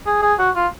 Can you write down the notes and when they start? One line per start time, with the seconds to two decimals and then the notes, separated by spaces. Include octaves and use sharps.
0.06 G#4
0.22 G#4
0.39 F#4
0.56 F4